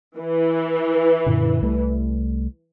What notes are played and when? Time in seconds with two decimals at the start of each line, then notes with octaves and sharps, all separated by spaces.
0.18 E3
1.26 F#2 A#2 D3
1.61 C2 G3 A3